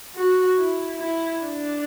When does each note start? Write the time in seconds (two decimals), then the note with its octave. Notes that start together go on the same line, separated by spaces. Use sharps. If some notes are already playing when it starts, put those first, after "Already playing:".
0.15 F#4
0.57 E4
1.00 E4
1.43 D4